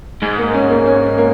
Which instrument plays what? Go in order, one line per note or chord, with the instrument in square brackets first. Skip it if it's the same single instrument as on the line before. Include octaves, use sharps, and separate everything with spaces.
[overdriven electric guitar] G#2 [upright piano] G#3
[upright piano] A#3
C#4
A#3
C#4
A#3